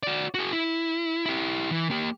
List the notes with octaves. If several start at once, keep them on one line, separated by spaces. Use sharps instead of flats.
F#4 D5
F#4 G#4
E4
E4 G4
E3
A#3 G4